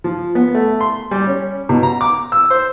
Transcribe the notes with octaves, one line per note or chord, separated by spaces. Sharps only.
F3
B3
A3
C6
G3
C#4
B2
A#5
D6
E6
C5